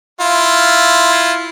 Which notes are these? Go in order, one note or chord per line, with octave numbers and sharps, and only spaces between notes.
E4 F4